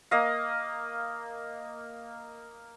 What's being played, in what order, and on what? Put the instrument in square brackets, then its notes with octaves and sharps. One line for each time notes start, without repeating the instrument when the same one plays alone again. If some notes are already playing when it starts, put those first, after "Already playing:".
[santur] A#3 D#5 F5